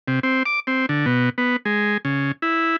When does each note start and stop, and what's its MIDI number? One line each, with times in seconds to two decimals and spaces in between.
0.08 0.20 48
0.23 0.43 60
0.46 0.60 86
0.67 0.86 60
0.89 1.06 50
1.06 1.29 47
1.38 1.56 59
1.65 1.97 56
2.05 2.32 49
2.42 2.76 64